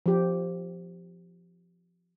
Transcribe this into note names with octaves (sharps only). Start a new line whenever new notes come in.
F3 G4